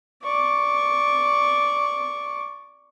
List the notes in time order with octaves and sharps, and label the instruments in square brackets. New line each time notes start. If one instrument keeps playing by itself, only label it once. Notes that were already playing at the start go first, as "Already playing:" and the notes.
[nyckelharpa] D5 C#6